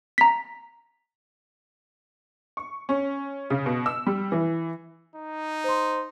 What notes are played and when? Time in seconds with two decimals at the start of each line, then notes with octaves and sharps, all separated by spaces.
0.18 A#5 B6
2.57 C#6
2.89 C#4
3.50 C#3
3.66 B2
3.86 E6
4.06 G3
4.32 E3
5.16 D#4
5.64 C5 C6